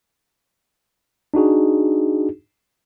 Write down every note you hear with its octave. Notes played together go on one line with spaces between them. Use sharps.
D4 D#4 F#4 G#4